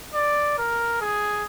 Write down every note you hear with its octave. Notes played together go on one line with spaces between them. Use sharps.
D5
A#4
G#4